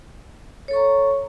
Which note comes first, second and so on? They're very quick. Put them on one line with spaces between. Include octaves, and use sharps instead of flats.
C#5 A4 C#6 A#5